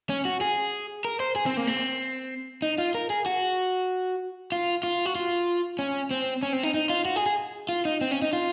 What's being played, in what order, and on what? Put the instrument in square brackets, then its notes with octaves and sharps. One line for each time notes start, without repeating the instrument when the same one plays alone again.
[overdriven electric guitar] C#4
F#4
G#4
A#4
C5
G#4
C4
A#3
C4
D#4
F4
A#4
G#4
F#4
F4
F4
F#4
F4
C#4
C4
C#4
C4
D#4
D#4
F4
F#4
G#4
G#4
F4
D#4
C4
C#4
D#4
F4